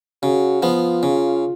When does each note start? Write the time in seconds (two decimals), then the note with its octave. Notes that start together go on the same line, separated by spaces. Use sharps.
0.23 C#3 F#4
0.62 F3 B3 F4
1.03 C#3